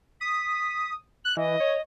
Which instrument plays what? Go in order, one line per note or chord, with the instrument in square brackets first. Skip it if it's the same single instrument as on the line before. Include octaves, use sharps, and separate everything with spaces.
[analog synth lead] D#6 [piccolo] B6
[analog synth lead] F#6 [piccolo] F#7
[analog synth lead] E3 [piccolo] D#5
[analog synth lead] C#5